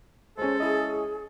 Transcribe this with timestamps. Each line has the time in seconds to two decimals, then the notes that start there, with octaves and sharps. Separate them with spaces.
0.37 G#3 C#4 A4 C5
0.60 E4 G#4 D#5